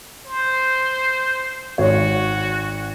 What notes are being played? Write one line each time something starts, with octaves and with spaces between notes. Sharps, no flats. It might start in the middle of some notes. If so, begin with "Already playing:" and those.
C5
G#1 F#4 C#5